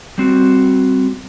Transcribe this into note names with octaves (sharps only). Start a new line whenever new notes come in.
G3 C4 F#4